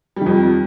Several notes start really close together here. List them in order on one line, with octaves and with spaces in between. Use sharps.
G3 D#3 F2